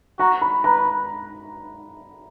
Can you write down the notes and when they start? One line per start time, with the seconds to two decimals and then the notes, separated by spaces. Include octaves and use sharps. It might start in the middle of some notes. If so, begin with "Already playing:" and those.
0.19 F#4 A#5
0.42 B5
0.64 B4 A#5